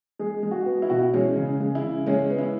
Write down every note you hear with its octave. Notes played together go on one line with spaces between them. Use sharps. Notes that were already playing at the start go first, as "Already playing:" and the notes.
G#3 G#4
G#3
F#4
B3
E4
B2 F#4
E4
G#3 C#4
C#3
G#3
E4
C#3
G#3 C#4
B3
E4